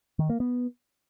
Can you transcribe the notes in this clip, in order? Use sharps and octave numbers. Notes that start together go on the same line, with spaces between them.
D#3
A#3
B3